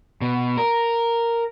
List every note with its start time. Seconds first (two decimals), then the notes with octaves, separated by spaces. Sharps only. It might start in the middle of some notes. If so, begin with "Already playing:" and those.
0.21 B2
0.57 A#4